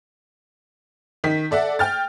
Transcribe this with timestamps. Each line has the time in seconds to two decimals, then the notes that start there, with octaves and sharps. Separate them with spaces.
1.24 D#3 B6
1.51 A4 D5 E5 F#5
1.79 G5 F6 A6